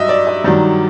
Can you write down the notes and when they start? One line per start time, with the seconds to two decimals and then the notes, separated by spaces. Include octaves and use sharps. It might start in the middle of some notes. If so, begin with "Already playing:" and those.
Already playing: G2 F#3 D#5 E5
0.09 D5
0.27 D#5
0.44 G2 D#3 F#3 D5